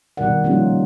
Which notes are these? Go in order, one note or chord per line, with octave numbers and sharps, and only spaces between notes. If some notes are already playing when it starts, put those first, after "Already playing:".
B2 D#3 G3 A#4 D5 F#5
F3 G3 A#3 C#4 D#4 F4